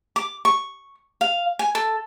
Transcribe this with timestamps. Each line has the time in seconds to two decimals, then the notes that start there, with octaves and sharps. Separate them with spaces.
0.16 D6
0.45 C#6
1.21 F5
1.59 G#5
1.75 A4